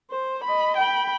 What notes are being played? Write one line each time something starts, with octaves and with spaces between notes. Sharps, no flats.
C5
D#5 B5
G5 B5